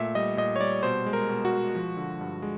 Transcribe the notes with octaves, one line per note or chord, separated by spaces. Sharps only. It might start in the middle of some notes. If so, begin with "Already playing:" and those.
Already playing: A#2 A3 E5
G3 D#5
A#2 D#5
C#5
G3 D5
B2 C5
G#3
A#4
B2
F#4
G#3
F3
D3
G2
G#3